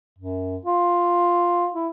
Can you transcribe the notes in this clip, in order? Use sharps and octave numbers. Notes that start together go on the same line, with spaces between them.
F#2
F4
E4